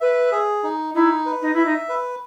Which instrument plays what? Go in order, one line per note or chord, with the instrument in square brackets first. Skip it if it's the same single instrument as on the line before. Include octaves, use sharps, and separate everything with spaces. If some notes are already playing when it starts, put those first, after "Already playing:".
[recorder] B4 [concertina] E5
[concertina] G#4
D#4
[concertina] D#4 [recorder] E4
[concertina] B4
[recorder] D#4
[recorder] E4 [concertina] E5
[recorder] D#4
[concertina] B4